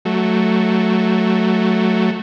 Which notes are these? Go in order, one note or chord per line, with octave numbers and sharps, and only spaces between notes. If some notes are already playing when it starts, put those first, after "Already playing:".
F#3 A3